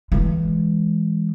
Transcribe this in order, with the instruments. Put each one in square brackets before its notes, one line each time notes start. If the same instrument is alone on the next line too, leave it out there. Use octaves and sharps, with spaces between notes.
[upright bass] E3 G#3